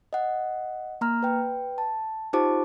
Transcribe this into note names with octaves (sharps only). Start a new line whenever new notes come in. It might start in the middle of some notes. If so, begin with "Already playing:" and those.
D#5 F#5
A#3 A#5 F6
B4 G5
A5
D#4 F4 G4 C5 A5 D6